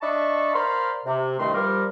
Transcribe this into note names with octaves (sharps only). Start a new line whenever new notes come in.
D4 D#5 E5 A5 B5 C#6
A#4 C5 D5 F5 B5 C6
C3
C2 G2 D#3 A3 D#5 C6
F3 G3 G4 A#4